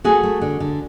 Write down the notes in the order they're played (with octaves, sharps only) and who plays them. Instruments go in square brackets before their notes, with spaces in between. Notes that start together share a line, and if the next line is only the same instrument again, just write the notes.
[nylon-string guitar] A3 F#4 G#4
A3
D3
D3